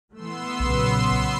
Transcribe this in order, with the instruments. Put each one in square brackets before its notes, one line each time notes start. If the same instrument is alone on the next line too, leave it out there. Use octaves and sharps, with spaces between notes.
[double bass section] E3 A3 [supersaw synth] B3 C6 E6
[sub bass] B1 [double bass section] A#2 C#3 F#3